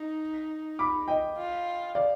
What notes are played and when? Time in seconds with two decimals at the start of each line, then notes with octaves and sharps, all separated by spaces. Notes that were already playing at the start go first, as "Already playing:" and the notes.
Already playing: D#4
0.79 B5 D6
1.08 D#5 G5
1.37 F4
1.95 D5 F5